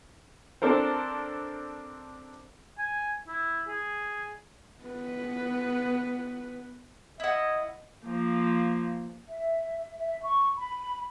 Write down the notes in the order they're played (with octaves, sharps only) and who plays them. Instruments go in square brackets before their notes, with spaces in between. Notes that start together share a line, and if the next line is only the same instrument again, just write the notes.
[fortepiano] C4 D4 A4 A#4 C5
[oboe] G#5
E4
G#4
[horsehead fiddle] B3 B4
[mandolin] E4 F#5 [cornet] D#5
[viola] F3 A#3
[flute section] E5
E5
C#6
B5